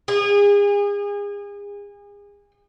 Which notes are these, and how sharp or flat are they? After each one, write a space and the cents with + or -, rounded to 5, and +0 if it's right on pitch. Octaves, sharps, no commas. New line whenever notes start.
G#4 -30